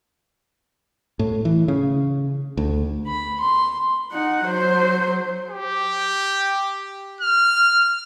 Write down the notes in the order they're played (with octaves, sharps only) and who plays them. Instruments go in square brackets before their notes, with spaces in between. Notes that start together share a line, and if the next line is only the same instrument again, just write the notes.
[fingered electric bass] A2
E3
C#3
D2
[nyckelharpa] B5
C6
[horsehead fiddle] D#4 F#5
F#3 C5
[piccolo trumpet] G4
F6